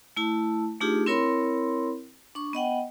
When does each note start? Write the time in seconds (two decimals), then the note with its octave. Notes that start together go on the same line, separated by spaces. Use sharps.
0.16 A3 E4 A5
0.81 A3 D4 D#4 F4 G4 G#4
1.06 C4 E4 A#4 C#5 B5 C6
2.35 D4 C#6
2.53 B3 D#5 F#5 G5